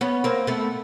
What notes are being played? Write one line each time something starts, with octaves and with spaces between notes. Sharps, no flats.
B3 C#4
A#3 C4
A3 B3